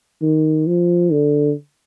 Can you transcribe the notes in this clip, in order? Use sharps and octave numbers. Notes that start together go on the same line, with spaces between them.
D#3
F3
D3